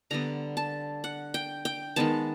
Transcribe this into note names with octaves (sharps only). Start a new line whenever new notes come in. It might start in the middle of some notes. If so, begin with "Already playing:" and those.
D3 G3 B3 A#5
A5
F#5
G5
G5
D#3 G#3 B3 A5